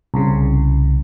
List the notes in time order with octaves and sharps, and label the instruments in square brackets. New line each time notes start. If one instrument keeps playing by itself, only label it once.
[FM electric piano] C2 C#3